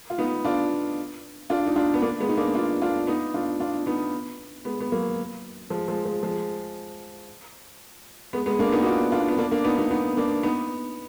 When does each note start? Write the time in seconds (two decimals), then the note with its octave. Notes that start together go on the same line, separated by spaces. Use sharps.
0.10 F4
0.18 B3 D#4
0.45 D4 F4
1.50 D4 F4
1.66 D#4
1.76 D4 F4
1.94 B3
2.02 A#3 D4
2.20 G#3 B3
2.29 D#4
2.37 A#3 D4
2.55 D4 F4
2.82 D4 F4
3.07 B3 D#4
3.34 D4 F4
3.60 D4 F4
3.86 B3 D#4
4.65 G#3 B3
4.80 B3
4.92 F#3 A#3
5.70 F3 G#3
5.88 F3 G#3
6.05 F3 G#3
6.23 F3 G#3
8.33 G#3 B3
8.46 G#3 B3
8.59 A#3 D4
8.72 B3 D#4
8.82 F#4
8.86 D4 F4
9.12 D4 F4
9.29 B3
9.38 A#3 D4
9.51 A#3 D4
9.64 B3 D#4
9.78 B3 D#4
9.91 B3 D#4
10.17 A#3 D4
10.43 B3 D#4